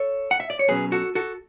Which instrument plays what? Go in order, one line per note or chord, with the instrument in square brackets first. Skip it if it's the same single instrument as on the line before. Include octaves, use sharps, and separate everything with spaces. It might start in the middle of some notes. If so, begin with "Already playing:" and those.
Already playing: [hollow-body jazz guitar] A4 C#5
F#5
E5
D5
C#5
B1 B2 F#3 C#4 G#4 B4
F#4 A4
F#4 A4